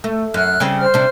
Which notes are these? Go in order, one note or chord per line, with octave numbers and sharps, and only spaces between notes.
A3
F#2 F6 F#6
C#3 G3 C4
C5 F6
C3 D4